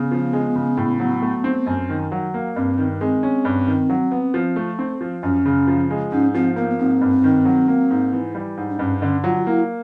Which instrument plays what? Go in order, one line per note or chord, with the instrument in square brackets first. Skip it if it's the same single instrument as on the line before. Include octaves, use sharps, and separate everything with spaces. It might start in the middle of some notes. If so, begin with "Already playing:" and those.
Already playing: [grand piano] C#3 [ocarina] B3
[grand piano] F3
G#3
C#3
A2
F#3
A3
C4
F#2
D#3
F#3
A#3
[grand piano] G2 [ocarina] C4
[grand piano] D#3
[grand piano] G#3 [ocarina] C4
[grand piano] C#4
G2
D#3
F#3
B3
F3
A3
C4
F3
[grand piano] F#2 [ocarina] C#4
[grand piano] C#3
F3
G#3
[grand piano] G#2 [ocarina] C#4
[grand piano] F3 [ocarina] C4
[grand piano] A#3 [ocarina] B3
[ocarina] B3
[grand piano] G#2 [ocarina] C4
[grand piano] G2
D#3
F#3
A#3
G#2
E3
G3
G#2
[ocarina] D4
[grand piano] G2 [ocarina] C#4
[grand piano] D3 [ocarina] C#4
[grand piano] F#3 [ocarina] F4
[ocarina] F4
[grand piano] A#3 [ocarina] E4